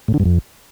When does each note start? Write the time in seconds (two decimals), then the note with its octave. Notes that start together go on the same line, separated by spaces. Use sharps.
0.08 A2
0.14 D3
0.20 G2
0.25 F2